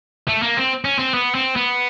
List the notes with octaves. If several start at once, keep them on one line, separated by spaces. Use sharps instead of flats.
A3
A#3
C4
C#4
C4
B3
C4
B3